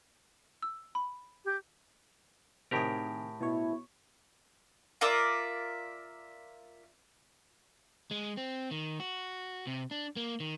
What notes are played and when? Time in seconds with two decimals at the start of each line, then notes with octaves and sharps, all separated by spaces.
0.62 E6
0.95 B5
1.45 G4
2.71 A2 C3 D#3 G4 G#4 A#4
3.41 B2 E4 C#5
5.01 F4 A#4 D5 E5
8.11 G#3
8.37 C4
8.71 D#3
9.00 F#4
9.67 C3
9.91 D4
10.16 A#3
10.40 D#3